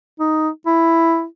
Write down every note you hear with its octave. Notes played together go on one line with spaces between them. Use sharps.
D#4
E4